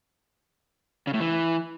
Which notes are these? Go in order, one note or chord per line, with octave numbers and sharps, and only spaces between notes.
C#3
A2
E3